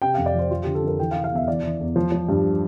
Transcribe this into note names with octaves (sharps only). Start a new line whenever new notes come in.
C3 G5
F5
F2
D5
F3 C5
F3 F4
G4
D3
A4
F2 A#4
E3 G5
F5
C3
F5
E2 E5
E3 D5
E3
E2
F3
F3
G2